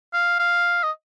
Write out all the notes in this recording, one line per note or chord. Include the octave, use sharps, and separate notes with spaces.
F5
F5
D#5